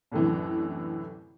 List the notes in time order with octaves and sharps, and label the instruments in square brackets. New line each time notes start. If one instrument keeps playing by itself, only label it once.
[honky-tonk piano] C2 F#2 A2 D3 E3